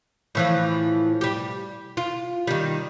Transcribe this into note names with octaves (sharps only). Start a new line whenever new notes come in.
A2 E3 F3
G3 G4
F4
D#3 G3